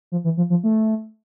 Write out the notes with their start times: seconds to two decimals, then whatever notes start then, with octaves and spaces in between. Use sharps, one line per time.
0.12 F3
0.24 E3
0.37 F3
0.50 F3
0.64 A3